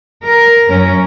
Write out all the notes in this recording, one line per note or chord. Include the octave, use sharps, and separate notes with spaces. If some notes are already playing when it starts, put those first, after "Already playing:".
A#4
F#2 C#4 A#4